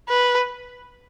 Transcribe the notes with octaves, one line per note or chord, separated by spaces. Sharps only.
B4